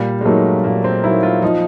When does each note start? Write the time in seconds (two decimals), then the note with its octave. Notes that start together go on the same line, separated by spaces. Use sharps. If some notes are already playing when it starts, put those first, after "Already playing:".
Already playing: A#2 G3
0.21 G#3
0.25 F#3 A3 A#3 D#4
0.64 A#2 A#3
0.84 C4
1.04 F#3 A#3 D#4 E4
1.23 F4
1.42 F3 D#4